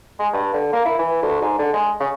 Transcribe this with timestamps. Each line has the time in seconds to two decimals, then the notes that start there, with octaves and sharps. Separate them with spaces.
0.19 G#3
0.33 G2
0.54 D3
0.73 A#3
0.85 E4
0.99 E3
1.23 D2
1.42 G#2
1.59 D3
1.74 G#3
2.00 C#3